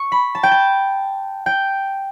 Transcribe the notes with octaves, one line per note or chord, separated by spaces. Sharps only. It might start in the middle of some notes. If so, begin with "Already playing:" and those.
Already playing: C#6
B5
A5
G5
A5
G5